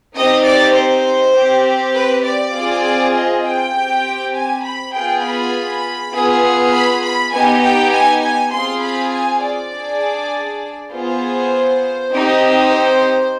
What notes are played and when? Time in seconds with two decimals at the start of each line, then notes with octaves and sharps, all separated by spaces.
0.16 C4 D#4 G4 D#5
0.45 D5
0.76 C5
1.35 C4 G4
1.95 B4
2.25 D5
2.54 C4 F4 G#4
3.15 D#5
3.45 G5
3.74 C4 G4
4.35 G#5
4.64 B5
4.94 B3 F4 G#4 G5
5.24 B5
6.13 B3 F4 G#4
6.73 B5
7.03 B5
7.33 B3 D#4 G4 G#5
7.63 G5
7.93 G#5
8.23 G#5
8.52 C4 F4 G#4 C6
8.83 B5
9.13 G#5
9.43 D5
9.72 D4 G#4
10.92 B3 F4 G#4 C5
12.12 C4 D#4 G4
12.71 C5